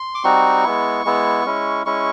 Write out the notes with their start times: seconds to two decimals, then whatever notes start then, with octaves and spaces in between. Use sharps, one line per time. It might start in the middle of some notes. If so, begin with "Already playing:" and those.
Already playing: C6
0.15 D6
0.24 G3 C4 D#4 F#4 C#6
0.64 G#3 B3 E4
1.05 G#3 B3 E4
1.45 G#3 C#4 E4
1.86 G#3 C#4 E4 C#6